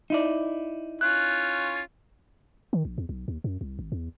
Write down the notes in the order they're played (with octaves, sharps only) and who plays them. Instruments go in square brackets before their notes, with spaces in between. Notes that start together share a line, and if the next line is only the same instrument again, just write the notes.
[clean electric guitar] D#4 E4 D5
[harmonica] C#4 F4 [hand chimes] F#6
[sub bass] D#3
A#1
E2
B1
D#2
F#2
C2
G#1
E2